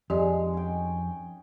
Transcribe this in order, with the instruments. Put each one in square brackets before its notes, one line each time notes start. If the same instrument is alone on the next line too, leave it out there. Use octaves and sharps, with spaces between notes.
[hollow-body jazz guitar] F2 [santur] G#3 D#4 [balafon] G4 D5 D#5
[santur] C#4 G5